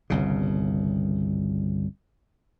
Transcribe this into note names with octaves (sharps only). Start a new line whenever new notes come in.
G1 C2 C#3